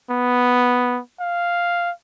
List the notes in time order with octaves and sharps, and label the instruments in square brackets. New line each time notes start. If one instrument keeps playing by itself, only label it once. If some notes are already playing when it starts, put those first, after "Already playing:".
[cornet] B3
F5